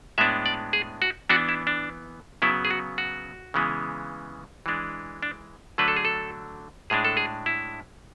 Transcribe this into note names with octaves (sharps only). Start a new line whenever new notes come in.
A2 G#3 B3 D4 E5
D5
G#4
F#4
E3 B3 D4 F#4
E4
D4
C#3 F#3 B3 E4
G#4
F#4
F#4
C#3 E3 G#3 B3
E3 G#3 D4
D4
D3 F#3 A3 D4 B4
A4
G#4
A4
A2 G#3 D4 G#4
A4
G#4
E4